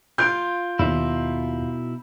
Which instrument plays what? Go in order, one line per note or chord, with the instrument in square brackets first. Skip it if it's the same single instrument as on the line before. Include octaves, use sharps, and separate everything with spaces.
[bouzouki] F4 [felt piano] G6 D7
[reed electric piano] D#2 [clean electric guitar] B2 D#4 E4